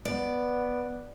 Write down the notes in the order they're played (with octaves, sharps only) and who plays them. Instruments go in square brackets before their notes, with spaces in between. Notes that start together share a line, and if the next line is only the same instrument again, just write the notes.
[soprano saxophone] B3 [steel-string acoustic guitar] D5